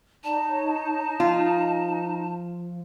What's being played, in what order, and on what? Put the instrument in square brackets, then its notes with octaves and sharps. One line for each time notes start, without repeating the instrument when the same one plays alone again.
[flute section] D#4 [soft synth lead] D5 [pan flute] A5
[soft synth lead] C#5
[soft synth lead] F3 [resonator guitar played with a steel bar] F4